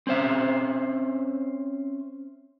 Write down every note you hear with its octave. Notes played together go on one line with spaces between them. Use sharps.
C4 C#4 C5 E5